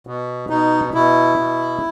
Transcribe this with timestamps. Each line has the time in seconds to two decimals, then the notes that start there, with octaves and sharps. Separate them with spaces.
0.07 B2
0.50 B2 D#4
0.94 B2 E4
1.38 B2